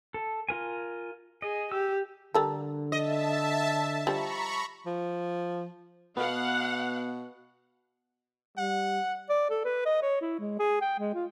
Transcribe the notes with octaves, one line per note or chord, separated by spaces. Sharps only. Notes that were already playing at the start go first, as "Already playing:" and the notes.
A4
F4 A#4 G#5
G#4 D#5
G4 E6
D3 G3 A4 A#4
D#5 E5 A5
F3 G3 A#5 B5 C#6
F3
B2 B3 F5 F#5
G3 F#5
D5
A4
B4
D#5
C#5
E4
G#3
G#4
G5
G#3
F4